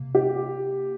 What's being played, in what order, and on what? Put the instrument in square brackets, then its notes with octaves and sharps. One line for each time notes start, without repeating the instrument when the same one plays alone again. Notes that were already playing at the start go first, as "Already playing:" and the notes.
Already playing: [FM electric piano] C3 A#3
[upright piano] G4